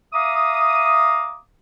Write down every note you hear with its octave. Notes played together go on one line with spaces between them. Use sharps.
E5 F5 A#5 D6 D#6